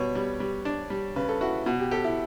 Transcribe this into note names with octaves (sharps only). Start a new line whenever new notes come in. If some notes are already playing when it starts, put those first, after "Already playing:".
Already playing: B2 G3 B4 C#5
G3
G3
D4
G3
C#3 B4
A4
E4 F#4
B2 F#4
G4
G4 A4
E4